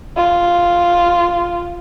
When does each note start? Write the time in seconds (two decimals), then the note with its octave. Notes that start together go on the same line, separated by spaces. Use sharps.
0.17 F4